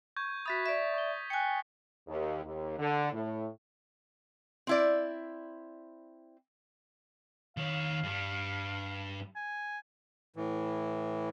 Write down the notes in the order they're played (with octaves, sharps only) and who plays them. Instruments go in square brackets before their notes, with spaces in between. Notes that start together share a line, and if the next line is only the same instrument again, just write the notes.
[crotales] C#6 G6 G#6
[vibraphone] F#4 E5 B5 [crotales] D#6 A6 B6
[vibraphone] D5 E5
[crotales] C#6 G7
[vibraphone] G5 G#5 [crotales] F#6 C#7
[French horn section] D#2
D#2
D3
A2
[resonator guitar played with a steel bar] C4 E4 D5
[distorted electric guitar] D#3 C#5 [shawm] F5
[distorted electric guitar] G2 G3
[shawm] G#5
[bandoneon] A2 E3